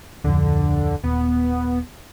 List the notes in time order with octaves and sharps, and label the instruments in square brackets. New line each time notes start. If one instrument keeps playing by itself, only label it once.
[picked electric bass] D1 F2 [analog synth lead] D3
[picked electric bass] D#1 [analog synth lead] B3